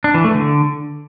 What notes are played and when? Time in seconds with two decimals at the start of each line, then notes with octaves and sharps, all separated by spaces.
0.04 D4
0.14 E3
0.24 A3
0.35 D3